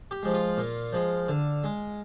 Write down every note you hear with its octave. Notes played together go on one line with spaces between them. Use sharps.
G4
F3 G#3
F4
A#2
F3 G#3
D3
G#3